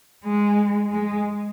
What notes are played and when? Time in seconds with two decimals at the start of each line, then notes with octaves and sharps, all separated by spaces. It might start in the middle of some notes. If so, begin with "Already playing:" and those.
0.24 G#3
0.92 G#3